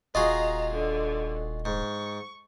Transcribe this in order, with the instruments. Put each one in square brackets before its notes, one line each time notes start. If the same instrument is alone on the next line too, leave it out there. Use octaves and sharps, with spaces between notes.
[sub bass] D#1 [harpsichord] F4 F#4 G#4 [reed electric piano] D#5 [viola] A#5
[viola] D3
[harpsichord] G#2 [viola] C#6